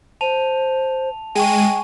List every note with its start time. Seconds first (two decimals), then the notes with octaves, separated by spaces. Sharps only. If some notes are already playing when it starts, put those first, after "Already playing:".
0.21 C5 A5 F7
1.35 G#3 G5 G#5 C#6 D#7